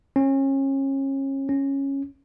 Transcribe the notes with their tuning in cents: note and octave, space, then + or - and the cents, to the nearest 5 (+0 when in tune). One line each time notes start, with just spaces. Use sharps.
C#4 -30
C#4 -10